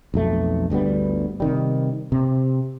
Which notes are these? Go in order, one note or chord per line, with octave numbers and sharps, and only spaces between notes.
B1 F2 A3
G1 D2 G3 B3
C3 D#3 G3
C3